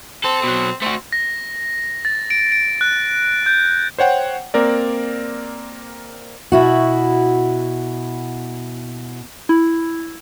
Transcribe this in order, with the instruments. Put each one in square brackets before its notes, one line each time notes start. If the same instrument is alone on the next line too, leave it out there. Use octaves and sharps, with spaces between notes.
[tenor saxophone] C4 [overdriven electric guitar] A4
[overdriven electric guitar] B2 F#3
[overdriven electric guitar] A3 F#4 [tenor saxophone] C4
[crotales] A#6
A6
D7
D7
F#6
G6
[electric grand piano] C5 C#5 F#5 G5
A#3 C4 A#4 D5
[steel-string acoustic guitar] B2 E4 F#4
[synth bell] E4